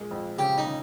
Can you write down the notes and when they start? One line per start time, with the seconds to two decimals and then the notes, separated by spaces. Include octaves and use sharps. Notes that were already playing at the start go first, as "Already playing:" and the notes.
Already playing: A#2 G#3
0.11 F2
0.38 C#3 G4
0.58 D#4
0.66 C#3